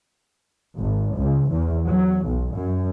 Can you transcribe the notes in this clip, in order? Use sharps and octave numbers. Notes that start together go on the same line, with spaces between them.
G#1
C#2
E2
F#3
B1
F#2